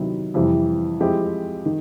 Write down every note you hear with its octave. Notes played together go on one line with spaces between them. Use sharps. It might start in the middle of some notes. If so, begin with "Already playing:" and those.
Already playing: C3 D#3 F#3 B3 E4
F2 C3 E3 G3
F3 G#3 C4 E4 G4
D#3